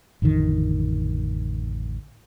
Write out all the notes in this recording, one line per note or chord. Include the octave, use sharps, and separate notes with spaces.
A1 F2 D3 D#3